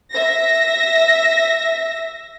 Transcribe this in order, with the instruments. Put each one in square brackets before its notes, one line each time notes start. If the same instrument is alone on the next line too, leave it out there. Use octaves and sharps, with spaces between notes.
[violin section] E5 A#6